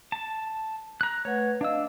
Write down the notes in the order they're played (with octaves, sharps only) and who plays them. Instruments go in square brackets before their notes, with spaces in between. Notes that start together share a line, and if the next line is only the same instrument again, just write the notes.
[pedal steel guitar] A5
A#5 F#6
[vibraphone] A3 B4 F#5 [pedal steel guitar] C#5
[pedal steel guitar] D4 E6 [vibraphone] D#5 F5